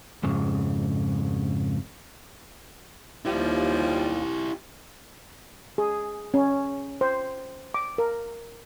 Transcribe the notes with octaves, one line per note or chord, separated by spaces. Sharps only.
F2 G#2 C#3
D#2 F3 G3 E4 F4 G4
G#4
C#4
C5
D6
A#4